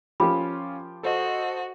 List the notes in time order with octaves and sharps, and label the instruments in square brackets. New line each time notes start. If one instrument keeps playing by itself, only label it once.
[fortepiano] F3 G4 [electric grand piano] C#4 F4 [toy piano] A#4 B5
[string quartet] F#4 [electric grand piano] A4 C5 D#5